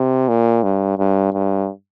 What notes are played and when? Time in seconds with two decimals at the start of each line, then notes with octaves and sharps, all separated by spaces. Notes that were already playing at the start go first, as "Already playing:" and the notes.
Already playing: C3
0.28 A#2
0.63 G2
0.98 G2
1.33 G2